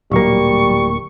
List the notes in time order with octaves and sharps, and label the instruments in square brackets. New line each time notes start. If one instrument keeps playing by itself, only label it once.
[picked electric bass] D1 A#3 [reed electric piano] A#2 F#3 [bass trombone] G3 [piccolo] C#6